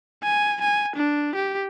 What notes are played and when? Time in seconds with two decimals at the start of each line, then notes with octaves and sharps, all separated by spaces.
0.24 G#5
0.62 G#5
0.96 D4
1.36 G4